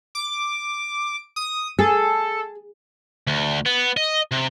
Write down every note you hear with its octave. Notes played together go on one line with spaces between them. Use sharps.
D6
D#6
G#4 A4
D2
B3
D#5
C3